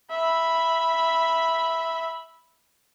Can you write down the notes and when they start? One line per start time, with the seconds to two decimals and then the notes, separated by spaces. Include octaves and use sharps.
0.12 E5 B5